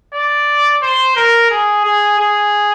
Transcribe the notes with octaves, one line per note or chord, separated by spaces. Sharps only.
D5
C5
A#4
G#4
G#4
G#4